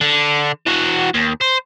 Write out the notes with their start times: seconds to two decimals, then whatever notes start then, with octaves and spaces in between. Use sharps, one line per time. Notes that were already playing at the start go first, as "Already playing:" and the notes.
0.01 D3
0.66 E3 F#4
1.14 D#2
1.41 C5